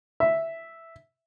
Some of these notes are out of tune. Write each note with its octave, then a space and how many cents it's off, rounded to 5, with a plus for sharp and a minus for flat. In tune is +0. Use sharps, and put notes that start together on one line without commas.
E5 +0